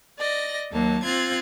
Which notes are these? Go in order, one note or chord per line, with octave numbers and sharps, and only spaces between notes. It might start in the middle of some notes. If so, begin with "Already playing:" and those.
D5 D#5 A#6
D#2 F#3 A#3 A5
C4 F4 F#6 G#6 A6